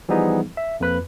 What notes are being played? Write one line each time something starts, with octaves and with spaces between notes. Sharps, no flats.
E3 F3 G3 B3 D#4 G#4
E5
F2 A#3 B4 B5 F#6